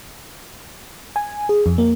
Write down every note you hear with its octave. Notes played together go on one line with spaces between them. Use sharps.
G#5
G#4
F2
A#3